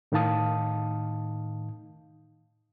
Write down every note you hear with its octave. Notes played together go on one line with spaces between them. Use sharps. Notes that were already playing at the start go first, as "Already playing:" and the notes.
A2 D#3 D#4 F5 A5 D#6